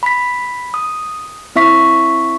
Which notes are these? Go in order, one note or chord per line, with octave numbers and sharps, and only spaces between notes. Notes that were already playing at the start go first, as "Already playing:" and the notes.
B5 B6
D#6
C4 E4 E5 C#6 B6